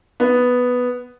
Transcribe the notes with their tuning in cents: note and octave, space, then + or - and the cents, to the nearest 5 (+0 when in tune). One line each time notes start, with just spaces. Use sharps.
B3 +0